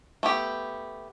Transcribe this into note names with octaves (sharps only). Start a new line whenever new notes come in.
A3 B3 G4